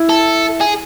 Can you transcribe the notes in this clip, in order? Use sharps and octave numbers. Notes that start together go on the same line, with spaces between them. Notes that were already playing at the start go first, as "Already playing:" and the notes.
Already playing: E4
A4
G#4